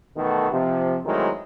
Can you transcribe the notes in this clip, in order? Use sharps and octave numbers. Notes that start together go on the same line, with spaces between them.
B2 D#3 E3 A3 F#4 A4
C3 F3
D#3 E3 F#3 G#3 A3 C4